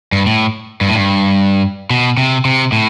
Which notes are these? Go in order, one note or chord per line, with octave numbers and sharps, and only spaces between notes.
G2
A2
G2
A2
G2
B2
C3
C3
A2